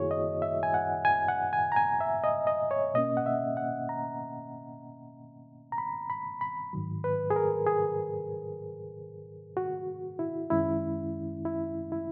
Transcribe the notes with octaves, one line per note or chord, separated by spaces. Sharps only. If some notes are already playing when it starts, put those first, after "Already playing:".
Already playing: F#2 D#3 A#3 E4 F#4 G#4 C#5
D#5
E5
G#5
F#5
G#5
F#5
G#5
A#5
G#5
E5
D#5
D#5
C#5
B2 A#3 C#4 D#5
F#5
E5
F#5
A#5
A#5
B5
B5
B5
G#2 D#3 F#3
B4
G#4
A#4
G#4
F#4
E4
F#2 D#3 G#3 C#4 E4
E4
E4